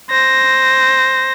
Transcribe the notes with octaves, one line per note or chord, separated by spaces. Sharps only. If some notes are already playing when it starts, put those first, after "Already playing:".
C5 A#6